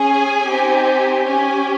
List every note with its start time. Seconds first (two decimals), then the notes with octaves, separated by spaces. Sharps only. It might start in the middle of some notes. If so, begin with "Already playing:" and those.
Already playing: C#4 G#4 G#5
0.47 C4 D#4 G4
1.26 C#4 G4 G#5